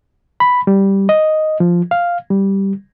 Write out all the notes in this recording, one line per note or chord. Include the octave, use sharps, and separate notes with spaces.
B5
G3
D#5
F3
F5
G3